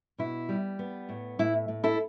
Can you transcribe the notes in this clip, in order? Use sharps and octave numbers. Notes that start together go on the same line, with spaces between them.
B2 E4
G3
B3
A2
A2 E4
A2
E4 A4